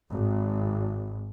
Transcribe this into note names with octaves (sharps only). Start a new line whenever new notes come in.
G#1